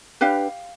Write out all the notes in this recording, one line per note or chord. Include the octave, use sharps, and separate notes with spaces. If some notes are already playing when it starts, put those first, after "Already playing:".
D4 G4 B4 F5